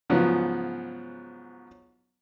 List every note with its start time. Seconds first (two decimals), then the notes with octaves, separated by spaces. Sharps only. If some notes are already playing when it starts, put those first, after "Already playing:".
0.10 G#2 C#3 F3 F#3 B3